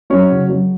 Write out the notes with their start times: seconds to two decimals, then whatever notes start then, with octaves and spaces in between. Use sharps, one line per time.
0.10 F#3 C#4 C#5
0.30 C#3
0.49 F#3